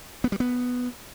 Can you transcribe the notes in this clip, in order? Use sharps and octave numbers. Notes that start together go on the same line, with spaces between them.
B3
G3
B3